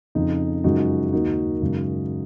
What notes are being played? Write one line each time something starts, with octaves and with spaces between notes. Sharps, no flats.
F2 C#3 F3 D#4
F#2 C#3 F3 G#3 D#4 F#4
D#2 D#3 A#3 D#4 F#4
F#2 C#3 G#3